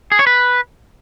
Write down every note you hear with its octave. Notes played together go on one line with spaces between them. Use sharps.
G#4
C#5
B4